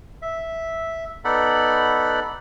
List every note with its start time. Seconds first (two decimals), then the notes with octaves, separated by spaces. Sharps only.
0.22 E5
1.25 B3 D#4 A4 D5 F#5 B5